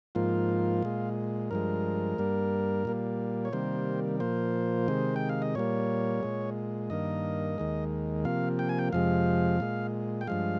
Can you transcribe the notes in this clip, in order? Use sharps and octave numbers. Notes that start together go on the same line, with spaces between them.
G#2 F3 A#3 F4
A#2 G#3
G2 F3 G#3 A#4
G2 G3 A#3
A#2 G3 A#3
C#5
C3 D#3 G3 A#3 C5
A#2 F3 A#3 C5
C3 D#3 G#3
G5
F5
D#5
A#2 G3 A#3 C#5
A#2 G#3
G2 D#3 A#3 D#5
D#2 D#3 G#3
C3 F3 A#3 F5
G5
G#5
G5
F2 C3 F3 G#3 F5
A#2 G#3
G5
G2 F3 G#3 F5